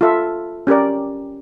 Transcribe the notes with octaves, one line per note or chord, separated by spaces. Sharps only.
F4 A4 E5
C#4 G4 A#4 D5